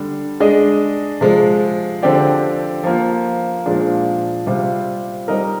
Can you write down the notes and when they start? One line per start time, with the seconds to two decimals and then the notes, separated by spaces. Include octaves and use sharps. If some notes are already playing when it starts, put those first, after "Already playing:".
Already playing: D3 G3 D4
0.40 G#3 D4 G#4 D#5
1.21 C3 F3 G#3
2.02 D3 F3 C4 G4 D5
2.83 F3 A#3 F4
3.66 A#2 F3 G#3 D4 F4
4.46 C3 G3 C4 F4 C5
5.28 G3 C4 D#4 A#4 D#5